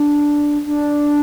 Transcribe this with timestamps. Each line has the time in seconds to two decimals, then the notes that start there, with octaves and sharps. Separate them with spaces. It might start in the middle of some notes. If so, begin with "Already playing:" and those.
Already playing: D4
0.66 D4